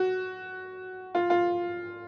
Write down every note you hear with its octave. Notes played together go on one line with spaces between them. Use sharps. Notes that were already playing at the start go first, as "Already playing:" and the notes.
Already playing: F#4
F4
F4